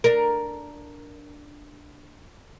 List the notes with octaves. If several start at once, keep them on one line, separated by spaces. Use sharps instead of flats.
D4 A#4